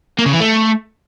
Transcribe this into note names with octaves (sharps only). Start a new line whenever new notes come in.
A#3
C#3
E3
A3